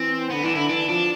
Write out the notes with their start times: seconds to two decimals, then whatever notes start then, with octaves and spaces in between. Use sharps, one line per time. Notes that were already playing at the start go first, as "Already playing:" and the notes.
Already playing: E3 C4
0.30 D3 B3
0.43 E3 D4
0.56 D3 E4
0.69 E3 D4
0.89 F3 D4